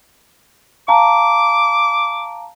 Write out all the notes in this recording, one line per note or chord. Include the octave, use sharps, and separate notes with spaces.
F5 A5 A#5 D6